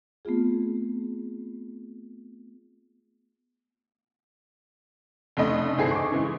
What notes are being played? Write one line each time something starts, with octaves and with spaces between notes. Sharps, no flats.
A3 B3 C4 F4 G#4
F1 C#3 A3 D#5 B5
G1 E3 C4 G#4 A4 C7
C#6 D6
C#3 E3 G#3